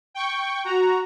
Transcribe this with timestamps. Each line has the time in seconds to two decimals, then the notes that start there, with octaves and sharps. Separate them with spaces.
0.14 G5 C#6
0.64 F#4 A#5